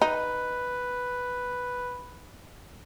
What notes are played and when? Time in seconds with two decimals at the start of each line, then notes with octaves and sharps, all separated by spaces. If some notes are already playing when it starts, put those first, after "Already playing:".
0.02 D#4 B4